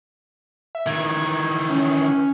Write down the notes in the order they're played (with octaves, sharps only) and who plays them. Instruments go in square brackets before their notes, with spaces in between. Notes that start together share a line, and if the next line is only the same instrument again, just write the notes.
[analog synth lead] E5
[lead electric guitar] D#3 E3 [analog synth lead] G#6
[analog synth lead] C#4